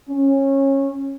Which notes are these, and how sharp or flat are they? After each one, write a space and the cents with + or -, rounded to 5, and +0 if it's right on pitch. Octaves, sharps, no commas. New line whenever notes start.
C#4 -20